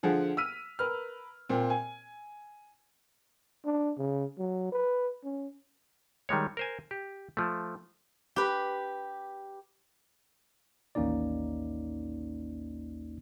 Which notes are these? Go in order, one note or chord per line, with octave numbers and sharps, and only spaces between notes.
D3 F3 G#4 F#5
E6 F6 B6 D#7
A#4 B4 F6
A#2 C4
G#5
D4
C#3
F#3
B4
C#4
D#3 G3 G#3 C#5
A#4 C5 G#5
G4
F3 A3
G4 B4
A1 D#2 A#3 C#4 D#4 D5